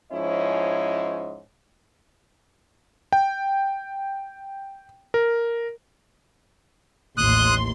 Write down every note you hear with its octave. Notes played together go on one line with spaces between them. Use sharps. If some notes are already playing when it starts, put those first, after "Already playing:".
G#2 F3 C#4 E4 C#5 D#5
G5
A#4
A1 D#2 C6 D#6 F#6